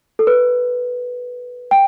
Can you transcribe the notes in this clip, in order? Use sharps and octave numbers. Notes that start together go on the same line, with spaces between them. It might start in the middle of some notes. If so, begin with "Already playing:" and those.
A4
B4
G5